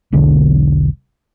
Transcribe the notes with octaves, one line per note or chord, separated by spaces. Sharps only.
E1 B1 D3